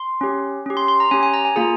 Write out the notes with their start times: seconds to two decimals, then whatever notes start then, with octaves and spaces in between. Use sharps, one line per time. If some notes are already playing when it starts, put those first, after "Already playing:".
Already playing: C6
0.21 C#4 G4
0.66 C#4 G4
0.77 C6
0.88 C6
1.00 A#5
1.11 C#4 G4 G#5
1.23 G#5
1.34 A#5
1.45 G#5
1.56 A#3 F4 G#4 A#5